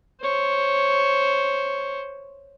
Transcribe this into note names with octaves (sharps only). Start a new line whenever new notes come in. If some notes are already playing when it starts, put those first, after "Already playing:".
C5 C#5